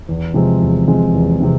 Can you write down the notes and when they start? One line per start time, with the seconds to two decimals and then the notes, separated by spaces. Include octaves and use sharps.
0.09 E2
0.34 C3 F3 G#3 C4
0.61 E2
0.88 C3 F3 G#3 C4
1.13 E2
1.40 C3 F3 G#3 C4